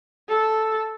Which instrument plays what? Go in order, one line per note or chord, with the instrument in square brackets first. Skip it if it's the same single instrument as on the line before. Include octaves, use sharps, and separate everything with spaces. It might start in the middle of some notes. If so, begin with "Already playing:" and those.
[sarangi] A4